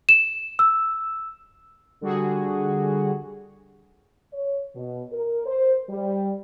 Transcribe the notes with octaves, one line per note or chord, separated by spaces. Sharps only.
E7
E6
D3 G3 F#4 G#4
C#5
B2
A#4
C5
G3